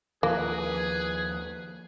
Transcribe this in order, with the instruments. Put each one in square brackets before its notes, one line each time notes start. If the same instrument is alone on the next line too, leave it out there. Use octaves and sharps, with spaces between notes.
[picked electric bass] D#2 F3 [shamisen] A#3 [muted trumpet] G#4 [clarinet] B4